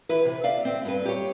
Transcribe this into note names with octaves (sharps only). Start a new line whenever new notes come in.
E3 E4 B4
C3
D5 E5 F5
C4
G2 B4
G4 C#5